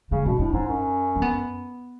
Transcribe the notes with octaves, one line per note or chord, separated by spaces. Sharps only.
C#3 A3
B2 C#4
A2 D4
G#2 C#4
F#2
C#4
B3